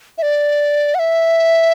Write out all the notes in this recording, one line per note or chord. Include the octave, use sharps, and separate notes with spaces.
E5
D5
F#5
E5